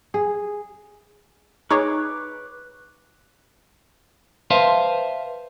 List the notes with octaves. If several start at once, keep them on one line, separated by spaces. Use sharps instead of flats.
G#4
D#4 G#4 B4 C#5 C#6 D6
B4 C5 E5 F5 A5 C6